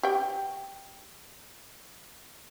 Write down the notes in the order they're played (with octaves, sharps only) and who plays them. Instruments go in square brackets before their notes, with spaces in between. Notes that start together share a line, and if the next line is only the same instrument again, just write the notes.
[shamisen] G4 G5